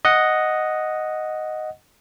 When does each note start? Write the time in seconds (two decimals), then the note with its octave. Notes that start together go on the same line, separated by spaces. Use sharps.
0.05 D#5 F#5